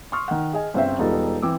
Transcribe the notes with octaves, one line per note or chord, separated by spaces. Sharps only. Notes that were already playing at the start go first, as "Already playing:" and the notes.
C6 C#6 D#6 F6
D#3 F#5
G#4 D#5 G#5
G1 C#3 C4 C5 E5
E1 G3 B3 D#4 F4 A4
E3 C4 D6 E6